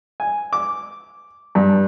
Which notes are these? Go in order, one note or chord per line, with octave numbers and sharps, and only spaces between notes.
G#5
D6
G2